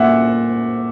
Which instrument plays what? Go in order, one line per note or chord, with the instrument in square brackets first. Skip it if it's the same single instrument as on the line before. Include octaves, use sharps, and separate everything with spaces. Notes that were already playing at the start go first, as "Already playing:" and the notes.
Already playing: [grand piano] A#2 E5 F#5